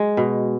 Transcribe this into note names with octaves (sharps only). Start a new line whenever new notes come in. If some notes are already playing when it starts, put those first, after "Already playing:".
Already playing: G#3
B2